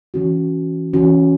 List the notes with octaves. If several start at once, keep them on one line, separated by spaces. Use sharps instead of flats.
E3 C#4 F#4
E3 C#4 F#4